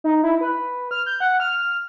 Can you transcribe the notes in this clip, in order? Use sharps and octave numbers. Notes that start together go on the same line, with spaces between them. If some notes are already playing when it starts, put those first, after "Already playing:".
D#4
E4
B4
F6
G6
F#5
F6